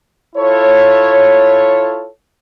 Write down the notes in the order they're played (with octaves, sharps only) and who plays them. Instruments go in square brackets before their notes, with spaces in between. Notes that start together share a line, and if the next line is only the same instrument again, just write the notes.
[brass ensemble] E4 F4 A4 C#5